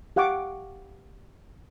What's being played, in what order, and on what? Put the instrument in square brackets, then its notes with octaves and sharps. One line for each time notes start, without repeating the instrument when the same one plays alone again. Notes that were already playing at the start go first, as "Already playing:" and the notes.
[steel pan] G4 F5 F#5 C#6 D6